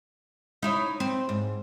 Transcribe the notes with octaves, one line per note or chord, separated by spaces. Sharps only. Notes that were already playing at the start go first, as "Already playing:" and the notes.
D#4 E4 C#5
C4
G#2